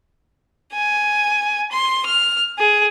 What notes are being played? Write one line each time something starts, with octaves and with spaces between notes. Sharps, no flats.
G#5
C6
F6
G#4